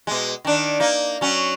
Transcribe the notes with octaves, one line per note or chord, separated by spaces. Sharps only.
B2 G#3
D#3 D4
A#3 D#4
F#3 C#4